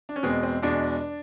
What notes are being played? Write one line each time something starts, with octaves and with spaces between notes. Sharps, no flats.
D4
C#4
E2 B2 G#3 C4
C4
E2 B2 G#3 D4